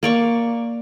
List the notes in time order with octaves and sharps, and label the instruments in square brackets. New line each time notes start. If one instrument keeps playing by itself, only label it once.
[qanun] A#3 D5 C#6